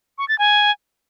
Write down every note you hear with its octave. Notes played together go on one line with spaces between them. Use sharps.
C#6
A6
G#5